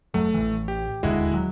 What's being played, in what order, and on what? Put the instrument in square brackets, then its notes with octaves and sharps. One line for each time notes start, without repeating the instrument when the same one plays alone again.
[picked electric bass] F#1 F#3 [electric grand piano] A3
[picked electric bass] A1 E3
[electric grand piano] G4
[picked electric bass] E1 D#2 D3 [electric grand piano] G#3 E4 F#4
[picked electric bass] F#3